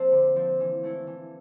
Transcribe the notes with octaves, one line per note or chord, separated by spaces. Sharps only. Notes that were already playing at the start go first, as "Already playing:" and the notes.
Already playing: F3 A#3 C4 A4
D3
F3 C4
E3
A3 E4 A4
E3